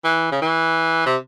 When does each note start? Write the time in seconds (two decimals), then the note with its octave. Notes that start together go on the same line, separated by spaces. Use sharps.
0.04 E3
0.32 C#3
0.42 E3
1.06 C3